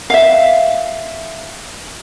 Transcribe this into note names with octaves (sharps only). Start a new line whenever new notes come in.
E5 F5